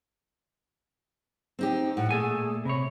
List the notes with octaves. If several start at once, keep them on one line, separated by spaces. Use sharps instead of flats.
C4 D#4 G4
A2 F#5
A#2 A3 G#4 A4 G#5
C3 C#5 B5